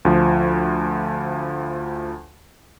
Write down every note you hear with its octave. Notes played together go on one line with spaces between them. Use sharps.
D2 F3